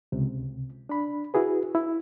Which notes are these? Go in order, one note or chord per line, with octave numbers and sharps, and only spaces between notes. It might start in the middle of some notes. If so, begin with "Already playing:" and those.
C#2 C3
D4 B5
E4 F#4 G#4 B4
E4